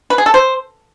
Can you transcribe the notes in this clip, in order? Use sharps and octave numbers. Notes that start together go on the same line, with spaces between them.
B4
G#4
A4
C5